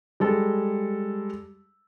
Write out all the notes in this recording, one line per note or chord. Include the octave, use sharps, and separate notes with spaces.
G3 G#3 A4